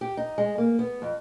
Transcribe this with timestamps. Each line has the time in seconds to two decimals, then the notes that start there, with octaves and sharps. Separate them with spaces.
0.01 G4
0.17 D#4
0.38 G#3
0.58 A#3
0.79 B3
1.02 F2